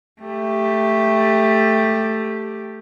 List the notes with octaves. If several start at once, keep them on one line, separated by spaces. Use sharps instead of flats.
A3 G4